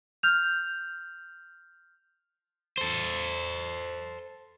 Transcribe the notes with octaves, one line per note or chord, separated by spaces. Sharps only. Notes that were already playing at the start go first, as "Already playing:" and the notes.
F6 G6 F7
A4 C5